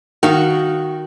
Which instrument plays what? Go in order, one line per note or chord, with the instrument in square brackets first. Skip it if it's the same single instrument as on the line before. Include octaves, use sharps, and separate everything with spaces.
[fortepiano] D#3 [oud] F#4 F5